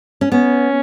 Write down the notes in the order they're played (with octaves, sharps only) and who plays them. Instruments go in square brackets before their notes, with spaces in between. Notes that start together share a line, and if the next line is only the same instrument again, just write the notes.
[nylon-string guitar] C#4
[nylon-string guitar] B3 [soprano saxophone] C#4